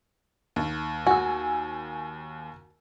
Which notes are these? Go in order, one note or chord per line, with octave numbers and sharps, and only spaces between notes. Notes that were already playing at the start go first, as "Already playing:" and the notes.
D#2
F#4 G#5 E6